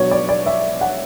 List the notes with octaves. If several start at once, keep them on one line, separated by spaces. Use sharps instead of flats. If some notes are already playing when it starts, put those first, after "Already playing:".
Already playing: B2 F#3 B3 D4 C#5
D5
D5
E5
F#5